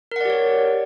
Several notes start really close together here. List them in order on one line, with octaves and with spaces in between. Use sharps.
A#4 F#5 D5 G4 C#5